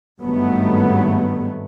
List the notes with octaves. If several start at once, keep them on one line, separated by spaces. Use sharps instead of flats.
G#1 G2 D#3 F#3 A3 B3